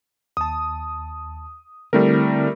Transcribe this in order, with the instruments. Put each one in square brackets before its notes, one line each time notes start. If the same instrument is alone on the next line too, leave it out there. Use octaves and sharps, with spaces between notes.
[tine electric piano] D#2 A5 [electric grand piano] D#6
[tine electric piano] D3 C4 E4 [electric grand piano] G3 A3 A#4